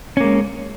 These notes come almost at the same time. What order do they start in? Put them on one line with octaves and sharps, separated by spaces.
C#4 A#3 G#3